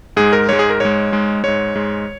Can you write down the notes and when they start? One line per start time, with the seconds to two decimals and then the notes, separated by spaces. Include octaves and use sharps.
0.17 G#2 G#3 G#4
0.33 A#4
0.49 G#2 G#3 C#5
0.59 G#4
0.70 A#4
0.80 G#2 G#3 C#5
1.12 G#2 G#3
1.44 G#2 G#3 C#5
1.75 G#2 G#3